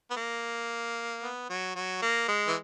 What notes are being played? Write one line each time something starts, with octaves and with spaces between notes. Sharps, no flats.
B3
A#3
B3
F#3
F#3
A#3
G#3
E3